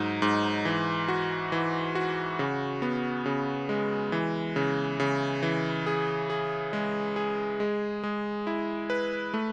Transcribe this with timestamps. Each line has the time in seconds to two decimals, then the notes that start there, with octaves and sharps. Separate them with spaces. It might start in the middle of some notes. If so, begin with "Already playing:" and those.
Already playing: G#2 F#3 D#4
0.22 G#2
0.65 E3
1.08 F#4
1.52 E3
1.95 F#4
2.39 C#3
2.82 B3
3.26 C#3
3.69 G#3
4.12 E3
4.56 C#3
5.00 C#3
5.43 E3
5.87 G#4
6.30 G#4
6.73 G#3
7.16 G#4
7.60 G#3
8.04 G#3
8.47 E4
8.90 B4
9.34 A3